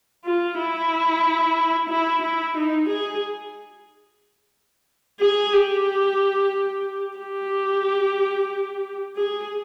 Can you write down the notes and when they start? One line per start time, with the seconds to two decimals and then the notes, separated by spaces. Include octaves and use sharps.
0.25 F4
0.59 E4
1.90 E4
2.23 E4
2.57 D#4
2.89 G#4
5.20 G#4
5.53 G4
7.18 G4
9.16 G#4